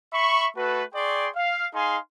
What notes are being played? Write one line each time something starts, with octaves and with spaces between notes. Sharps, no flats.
E5 B5 C#6
A3 F#4 A4 B4
G#4 D5 G5 C6 C#6
F5
D#4 G#4 F5 G#5 C6